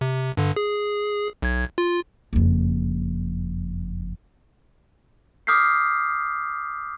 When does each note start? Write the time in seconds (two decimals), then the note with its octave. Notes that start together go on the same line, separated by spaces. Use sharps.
0.01 C3
0.37 G2 D3
0.56 G#4
1.42 B1 G#6
1.78 F4
2.33 F#1 F2
5.47 D6 D#6 F6 G6 B6 C7